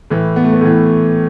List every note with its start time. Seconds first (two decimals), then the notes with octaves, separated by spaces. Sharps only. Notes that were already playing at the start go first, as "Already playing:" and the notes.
0.10 A2 E3
0.36 B3
0.44 A3
0.53 B3
0.61 A2 E3